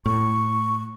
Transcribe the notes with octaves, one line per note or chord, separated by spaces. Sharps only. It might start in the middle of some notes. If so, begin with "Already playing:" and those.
A2 C#6